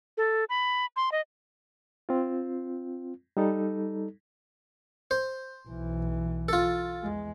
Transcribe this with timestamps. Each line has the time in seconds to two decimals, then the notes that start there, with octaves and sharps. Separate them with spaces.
0.17 A4
0.49 B5
0.96 C6
1.12 D#5
2.09 C4 F4
3.37 G3 D#4 A4
5.11 C5
5.68 B1 E3
6.49 F4 A4
7.03 E2 G#3